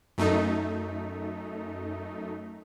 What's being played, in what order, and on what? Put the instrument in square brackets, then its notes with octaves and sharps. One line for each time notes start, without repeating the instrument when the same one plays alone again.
[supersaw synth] F#2 A3 D#4